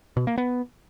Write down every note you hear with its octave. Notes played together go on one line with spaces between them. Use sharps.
B2
A#3
B3